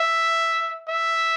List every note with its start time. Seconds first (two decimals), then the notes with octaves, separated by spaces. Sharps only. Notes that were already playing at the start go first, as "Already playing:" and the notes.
Already playing: E5
0.88 E5